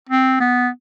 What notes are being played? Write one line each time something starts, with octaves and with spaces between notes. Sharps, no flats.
C4
B3